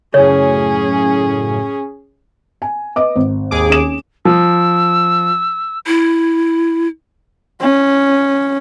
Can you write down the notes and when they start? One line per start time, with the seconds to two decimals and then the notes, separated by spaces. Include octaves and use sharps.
0.14 F#2 A2 C#3 C#4 G#4 C#5
2.62 G#5
2.96 B4 D#5 D6
3.15 G#1
3.51 D#2 G#4 D6
3.70 C#4 E7
4.25 F3 E6
5.87 E4
7.61 C#4